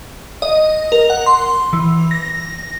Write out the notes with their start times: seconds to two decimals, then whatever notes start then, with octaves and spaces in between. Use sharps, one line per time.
0.42 D#5
0.92 A#4
1.10 F#5
1.26 C6
1.73 E3
2.11 A#6